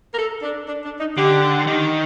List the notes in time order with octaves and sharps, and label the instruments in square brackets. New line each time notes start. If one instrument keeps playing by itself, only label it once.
[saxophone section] A#4
A4
D4
D4
D4
D#4
[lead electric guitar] D3 [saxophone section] G4
[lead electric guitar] D#3